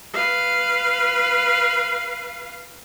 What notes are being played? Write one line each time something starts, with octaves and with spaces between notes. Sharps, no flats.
B4 F5